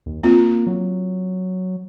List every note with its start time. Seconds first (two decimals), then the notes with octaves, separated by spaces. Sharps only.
0.06 D#2
0.23 A#3 C4 F4
0.67 F#3